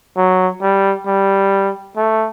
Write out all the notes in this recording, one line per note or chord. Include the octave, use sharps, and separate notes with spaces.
F#3
G3
G3
A3